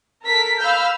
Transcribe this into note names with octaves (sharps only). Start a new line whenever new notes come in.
A4 A#4 B6
F5 B5 E6 F6 G6